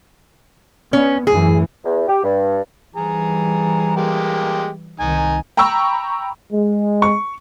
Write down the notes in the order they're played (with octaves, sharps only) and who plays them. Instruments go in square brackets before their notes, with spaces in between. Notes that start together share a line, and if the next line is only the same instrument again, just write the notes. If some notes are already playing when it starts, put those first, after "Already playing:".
[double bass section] B3 [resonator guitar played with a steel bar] C#4
[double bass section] F#2 A2 E3 [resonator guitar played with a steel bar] G#4
[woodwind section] E2
G4
G2
[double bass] E3 G3 [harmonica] G#4 A#5
[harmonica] G#3 A#3 G4
[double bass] C2 D#3 [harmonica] D#4 G#5
[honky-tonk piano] G5 A#5 B5 C#6 E6
[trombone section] G#3
[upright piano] C#6